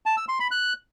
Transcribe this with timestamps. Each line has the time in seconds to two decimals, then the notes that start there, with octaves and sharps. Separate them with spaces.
0.06 A5
0.17 E6
0.28 C6
0.40 B5
0.51 F#6